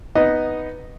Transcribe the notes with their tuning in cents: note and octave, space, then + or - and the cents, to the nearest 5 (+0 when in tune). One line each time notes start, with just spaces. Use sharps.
B3 +0 D#4 +0 D#5 +0